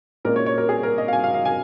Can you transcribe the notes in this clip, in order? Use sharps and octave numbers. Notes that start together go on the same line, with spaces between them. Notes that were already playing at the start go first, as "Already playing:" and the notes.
A#2 G#3 C#4 A#4
C#5
C#5
A#4
G#4
A#4
D#5
F5
G#5
F5
F5
G#5